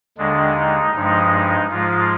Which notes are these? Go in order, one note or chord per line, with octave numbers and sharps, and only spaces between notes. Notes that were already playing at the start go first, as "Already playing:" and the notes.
D#2 D3 G#3 D4
D#4
G2 F3 G#3 D#4
D#4
G#2 F3 G#3 F4